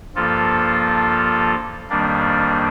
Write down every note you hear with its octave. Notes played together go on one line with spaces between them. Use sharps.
G2 F3 A#3 F4 A4
F2 D#3 G3 A#3 D4